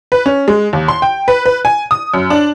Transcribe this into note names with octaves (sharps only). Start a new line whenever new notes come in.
B4
C#4
G#3
D#2
C6
G5
B4
B4
G#5
D#6
F#2
D4